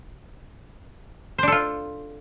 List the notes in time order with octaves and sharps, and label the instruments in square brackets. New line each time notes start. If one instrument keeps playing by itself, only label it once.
[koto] C5
D4
A4
F4